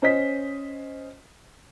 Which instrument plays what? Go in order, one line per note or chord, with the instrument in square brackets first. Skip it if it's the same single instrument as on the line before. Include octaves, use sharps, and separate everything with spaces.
[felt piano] C#4 C5 D#5 B6